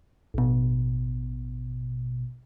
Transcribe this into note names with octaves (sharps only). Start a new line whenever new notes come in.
A1 B2